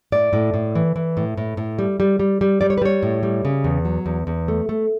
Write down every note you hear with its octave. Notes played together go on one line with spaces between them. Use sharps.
A2 D5
A2
A2
E3
E3
A2
A2
A2
G3
G3
G3
G3
G3 D5
C#5
B4
G3 C#5
A2
G3
C#3
E2
F#3
E2
E2
A3
A3